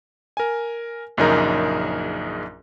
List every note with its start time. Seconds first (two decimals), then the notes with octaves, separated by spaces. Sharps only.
0.37 A#4 G#5
1.17 A#1 F#2 C#3 D#4 G#4 A#4